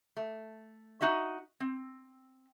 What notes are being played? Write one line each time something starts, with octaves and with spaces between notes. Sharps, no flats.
A3
D#4 F#4 D#5 E5
C4